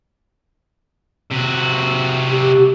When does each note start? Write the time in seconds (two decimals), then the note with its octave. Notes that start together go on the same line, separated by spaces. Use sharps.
1.31 C3 F#4
2.30 G4